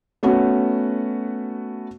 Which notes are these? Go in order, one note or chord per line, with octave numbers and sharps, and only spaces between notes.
A3 B3 C#4 F#4